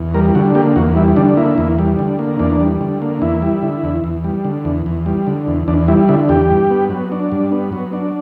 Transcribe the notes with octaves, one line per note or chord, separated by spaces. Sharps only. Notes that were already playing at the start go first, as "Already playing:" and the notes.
Already playing: E2
G3 A#4
D3 F#4
A#3 G4
E2 F#4
G3 E4
D3 D4
A#3 E4
E2
G3
D3
A#3
E2 D4
G3
D3
A#3
E2 E4
G3
D3
E2
E2
G3
D3
E2
E2
G3
D3
E2
E2 D4
G3 E4
D3 E4
E2 G4
G2
B3
F#3
D4
G2
B3
F#3
D4